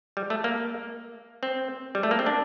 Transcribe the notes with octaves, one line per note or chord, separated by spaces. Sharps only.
G3
A3
A#3
C4
G3
A3
A#3
C4
D4